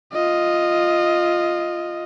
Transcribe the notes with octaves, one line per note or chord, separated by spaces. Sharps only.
F4 D#5